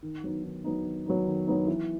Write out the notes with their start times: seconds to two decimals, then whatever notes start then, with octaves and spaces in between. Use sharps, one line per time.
0.03 D#3
0.24 F#3 B3 D#4
0.44 D#3
0.64 F#3 B3 D#4
0.85 D#3
1.06 F#3 B3 D#4
1.26 D#3
1.47 F#3 B3 D#4
1.67 E3